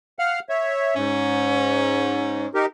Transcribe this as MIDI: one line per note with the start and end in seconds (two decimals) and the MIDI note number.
0.19 0.40 77
0.19 0.40 78
0.19 0.40 89
0.49 0.95 73
0.49 0.95 76
0.96 2.48 44
0.96 2.49 61
2.54 2.66 63
2.54 2.66 67
2.54 2.66 70